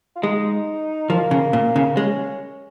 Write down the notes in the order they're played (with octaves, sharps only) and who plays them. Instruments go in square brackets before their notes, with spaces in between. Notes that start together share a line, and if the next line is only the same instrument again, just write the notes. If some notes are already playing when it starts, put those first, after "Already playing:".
[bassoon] F4
[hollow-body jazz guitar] G#3 [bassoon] D#4
[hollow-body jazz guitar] F3 [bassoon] A#3
[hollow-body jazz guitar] C#3
A#2
C#3
[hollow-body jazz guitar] G#3 [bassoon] C#4